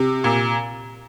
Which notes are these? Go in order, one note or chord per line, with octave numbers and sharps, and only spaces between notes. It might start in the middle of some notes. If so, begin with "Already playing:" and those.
Already playing: C3
A#2